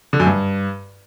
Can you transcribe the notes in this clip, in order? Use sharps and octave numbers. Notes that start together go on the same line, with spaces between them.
D3
F#2
G2